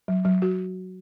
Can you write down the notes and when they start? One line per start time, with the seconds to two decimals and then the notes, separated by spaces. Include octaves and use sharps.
0.08 F#3
0.25 F#3
0.42 F#4